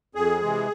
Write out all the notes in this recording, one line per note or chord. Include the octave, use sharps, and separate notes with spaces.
F2 G#4
C3 E3 G#3